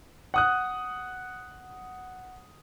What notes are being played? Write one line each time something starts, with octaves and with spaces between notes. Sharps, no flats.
F#5 D#6 F#6